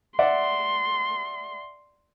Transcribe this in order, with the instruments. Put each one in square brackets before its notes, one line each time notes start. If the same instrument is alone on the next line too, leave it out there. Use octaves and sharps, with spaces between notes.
[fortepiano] D5 E5 F#5 [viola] C6